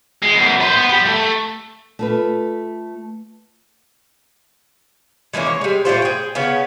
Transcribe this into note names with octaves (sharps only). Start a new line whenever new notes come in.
G#3
F#2 B2
B4 C5
B3
G4 B5
A3
A3 F4 B4
E3 G#3 A#3 C#4
C#5
G3 G#3
A2 D#3 F4 C5
G#4 G5
C#3 B3 C#4